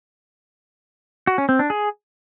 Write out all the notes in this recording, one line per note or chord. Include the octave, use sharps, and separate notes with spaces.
F#4
C#4
C4
D4
G#4